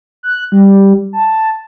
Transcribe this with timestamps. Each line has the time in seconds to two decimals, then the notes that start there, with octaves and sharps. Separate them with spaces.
0.23 F#6
0.52 G3
1.13 A5